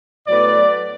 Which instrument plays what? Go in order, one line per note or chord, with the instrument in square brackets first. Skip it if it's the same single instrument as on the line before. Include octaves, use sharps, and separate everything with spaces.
[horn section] A2 F#3 B3 D5